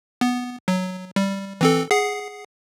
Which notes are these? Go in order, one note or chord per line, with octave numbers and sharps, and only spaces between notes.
B3
F#3
G3
E3 C4 A4
G#4 F#5 C7